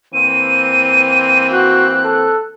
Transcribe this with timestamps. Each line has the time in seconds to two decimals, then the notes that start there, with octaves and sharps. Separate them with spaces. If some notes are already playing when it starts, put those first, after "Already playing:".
0.13 E3 A#3 C4 D#7
1.53 F#4 F#6
2.04 A4